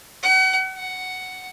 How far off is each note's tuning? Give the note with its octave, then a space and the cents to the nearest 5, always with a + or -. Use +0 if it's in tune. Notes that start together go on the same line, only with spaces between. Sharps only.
F#5 +35
F#5 +5